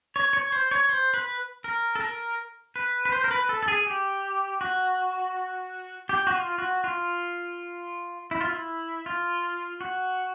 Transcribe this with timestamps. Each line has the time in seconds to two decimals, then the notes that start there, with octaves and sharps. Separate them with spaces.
0.16 C#5
0.33 C#5
0.52 C5
0.71 C#5
0.89 C5
1.14 B4
1.64 A#4
1.95 A4
2.01 A#4
2.76 B4
3.05 B4
3.12 C5
3.24 A#4
3.31 B4
3.49 A4
3.63 A4
3.68 G#4
3.87 G4
4.61 F#4
6.09 G4
6.27 F#4
6.34 F4
6.58 F#4
6.84 F4
8.31 E4
8.41 F4
8.49 E4
9.06 F4
9.81 F#4